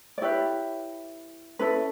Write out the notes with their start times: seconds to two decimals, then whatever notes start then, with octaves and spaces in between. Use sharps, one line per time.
0.18 D5
0.21 E4 G4 B4 C#5
1.59 C#4 E4 A4 B4